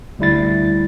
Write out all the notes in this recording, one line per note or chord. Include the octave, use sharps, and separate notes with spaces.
D2 G3 E4 A6